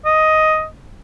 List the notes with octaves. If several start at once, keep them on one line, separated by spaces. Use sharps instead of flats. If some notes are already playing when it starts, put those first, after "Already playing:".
D#5